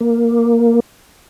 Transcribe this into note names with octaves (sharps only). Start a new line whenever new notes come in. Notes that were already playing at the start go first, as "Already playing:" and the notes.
A#3